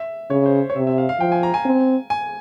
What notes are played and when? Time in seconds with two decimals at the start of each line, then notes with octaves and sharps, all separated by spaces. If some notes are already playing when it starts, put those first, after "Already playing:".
Already playing: E5
0.30 C#3 C#5
0.46 C5
0.70 C#5
0.76 C3 E5
0.87 E5
0.98 F5
1.09 F5
1.20 F3 G5
1.32 G#5
1.43 A#5
1.54 G#5
1.65 C4
2.10 G#5